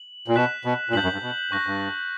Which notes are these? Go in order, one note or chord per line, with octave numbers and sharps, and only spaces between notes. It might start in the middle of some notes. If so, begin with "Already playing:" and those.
Already playing: F#7
A#2
B2 F#6 B6 E7
B2
A#2
G2 G6 B6 F#7
F#2
G2
B2
G2 C#6 F#6 A#6
G2